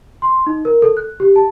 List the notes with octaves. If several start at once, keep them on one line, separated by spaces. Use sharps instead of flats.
C6
D#4
A#4
A4
F#6
G4
A5